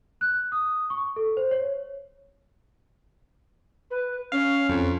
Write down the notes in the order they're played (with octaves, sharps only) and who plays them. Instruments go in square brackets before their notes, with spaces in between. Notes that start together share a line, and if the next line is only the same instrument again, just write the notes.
[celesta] F#6
D#6
C#6
A4
C5
C#5
[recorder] B4
[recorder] C#4 [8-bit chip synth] F5
[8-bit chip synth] F2